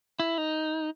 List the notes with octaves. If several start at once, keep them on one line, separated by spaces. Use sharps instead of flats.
E4
D#4